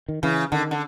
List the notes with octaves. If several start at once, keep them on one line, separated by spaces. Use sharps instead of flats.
D#3
C#3 E3
D3 D#3
D3